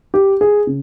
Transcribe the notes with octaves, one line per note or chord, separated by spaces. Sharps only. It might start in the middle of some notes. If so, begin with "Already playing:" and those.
G4
G#4
C#3